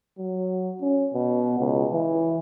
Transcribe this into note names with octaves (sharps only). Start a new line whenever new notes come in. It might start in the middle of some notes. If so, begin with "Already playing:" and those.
F#3
C#4
B2
C#2
E3